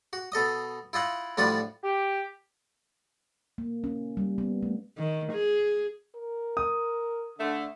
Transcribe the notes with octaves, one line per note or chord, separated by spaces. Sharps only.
F#4
B2 A4 D#5 D#6
E4 F4 D#5 F#5
A2 F3 G3 D4 F4 F#4
G4
A#3
C#4
G3
B3
A3
D#3
G#4
A#4
D#6
D3 A3